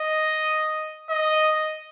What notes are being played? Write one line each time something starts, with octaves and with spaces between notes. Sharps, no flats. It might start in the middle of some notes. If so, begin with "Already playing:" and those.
Already playing: D#5
D#5